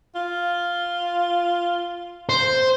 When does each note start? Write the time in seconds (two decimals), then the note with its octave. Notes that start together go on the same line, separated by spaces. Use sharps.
0.15 F4
2.29 C5